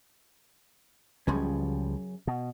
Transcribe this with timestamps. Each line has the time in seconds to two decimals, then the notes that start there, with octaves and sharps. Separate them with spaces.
1.27 C#2 F#2 C#3 F3 G3 C#4
2.27 B2